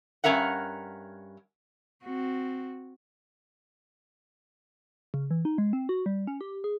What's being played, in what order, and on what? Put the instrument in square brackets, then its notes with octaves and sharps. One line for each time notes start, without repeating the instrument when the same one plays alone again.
[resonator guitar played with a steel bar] G2 G3 C#4 A#4 E5 F#5
[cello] C4 F#4
[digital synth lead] C#3
E3
D#4
G#3
C4
F#4
G3
C#4
G4
G#4